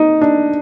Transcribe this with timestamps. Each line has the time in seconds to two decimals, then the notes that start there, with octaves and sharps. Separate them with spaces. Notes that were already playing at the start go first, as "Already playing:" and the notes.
Already playing: D#4
0.21 D4